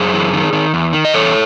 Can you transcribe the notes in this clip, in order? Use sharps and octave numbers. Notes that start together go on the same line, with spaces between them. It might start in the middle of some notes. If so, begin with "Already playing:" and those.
Already playing: F#2 G#4 C5
E3
D#3
D#3
E2
D#3
D#5
E2 A4 C#5